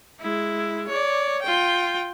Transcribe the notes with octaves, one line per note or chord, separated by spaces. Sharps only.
G#3 E4
C#5 D5
F4 G5